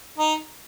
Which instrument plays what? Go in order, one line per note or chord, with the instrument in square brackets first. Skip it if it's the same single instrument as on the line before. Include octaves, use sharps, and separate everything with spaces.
[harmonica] D#4